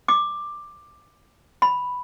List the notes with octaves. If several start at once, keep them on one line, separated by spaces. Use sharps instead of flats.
D6
B5